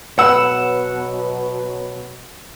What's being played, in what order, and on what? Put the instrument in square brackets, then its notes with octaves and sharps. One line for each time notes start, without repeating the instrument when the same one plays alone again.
[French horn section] B2 F#3 [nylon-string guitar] B4 [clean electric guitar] F#5 [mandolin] E6